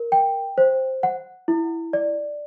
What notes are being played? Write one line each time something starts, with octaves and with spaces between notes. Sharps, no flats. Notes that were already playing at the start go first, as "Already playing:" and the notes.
Already playing: A#4
G5
C5
F#5
E4
D5